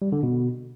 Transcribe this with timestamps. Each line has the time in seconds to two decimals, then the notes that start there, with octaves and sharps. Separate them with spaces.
0.02 G3
0.12 D3
0.23 B2